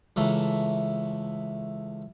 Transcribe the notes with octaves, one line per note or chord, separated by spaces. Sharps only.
C#2 E3 A3 A#5